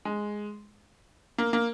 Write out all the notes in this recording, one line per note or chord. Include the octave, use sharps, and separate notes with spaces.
G#3
A#3
A#3